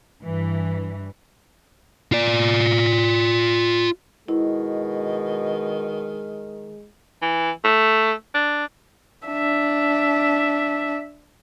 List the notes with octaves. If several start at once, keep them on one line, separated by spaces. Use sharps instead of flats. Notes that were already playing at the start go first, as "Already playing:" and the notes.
G2 E3
F4 D5
B2 D#3 G#3 E4
E3
A3
D4
D4 E5